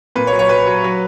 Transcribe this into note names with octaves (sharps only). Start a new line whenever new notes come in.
A#2 B4
C#5
F#3
C#5
F#3 B4
F#3
F#3